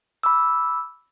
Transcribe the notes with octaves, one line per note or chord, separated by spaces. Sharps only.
B5 D6 E6